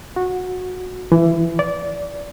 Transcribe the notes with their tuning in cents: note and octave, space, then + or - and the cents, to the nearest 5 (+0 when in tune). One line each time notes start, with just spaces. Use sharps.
F#4 -15
E3 +20
D5 -20